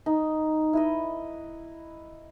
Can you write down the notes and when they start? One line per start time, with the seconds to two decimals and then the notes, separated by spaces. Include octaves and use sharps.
0.06 D#4
0.73 E4 B4 D#5